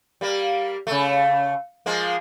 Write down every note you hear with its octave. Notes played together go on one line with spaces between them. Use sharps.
G3 A#3
C#3 A3
F3 G#3 A#3